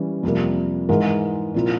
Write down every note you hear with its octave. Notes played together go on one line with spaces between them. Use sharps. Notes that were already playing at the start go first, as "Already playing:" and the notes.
Already playing: E3 G3 C#4
F2 C3 G3 A#3
G#2 E3 G#3 E4 A#4
A#2 F3 C4 E4 A#4